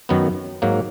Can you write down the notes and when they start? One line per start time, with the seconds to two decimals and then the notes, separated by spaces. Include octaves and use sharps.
0.09 F#2 D#3 F#3 B3
0.62 G#2 F#3 A#3